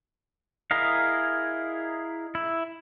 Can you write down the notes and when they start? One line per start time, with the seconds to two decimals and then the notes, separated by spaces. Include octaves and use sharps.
0.71 E4 G#4 A#4 D#5 F5
2.35 E4